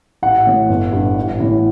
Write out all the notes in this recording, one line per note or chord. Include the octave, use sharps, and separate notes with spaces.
A1 F#5
A2 E3
G1
G2 D3
A1
A2 E3